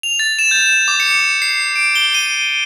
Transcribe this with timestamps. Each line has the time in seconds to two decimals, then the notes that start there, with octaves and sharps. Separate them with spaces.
0.03 F7
0.19 A6
0.39 E7
0.51 G6
0.66 E7
0.88 D6
1.00 C#7
1.42 C7
1.76 D7
1.95 G7
2.14 D#7